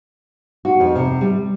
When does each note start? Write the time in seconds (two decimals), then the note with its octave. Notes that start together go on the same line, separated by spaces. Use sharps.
0.65 F#4
0.80 F2
0.95 C3
1.21 G3